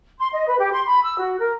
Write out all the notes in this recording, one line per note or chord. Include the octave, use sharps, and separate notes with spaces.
C6
D#5
B4
G4
C6
B5
E6
F#4
A#4